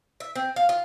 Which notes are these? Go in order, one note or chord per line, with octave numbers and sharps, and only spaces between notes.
E5
C4
F5
F4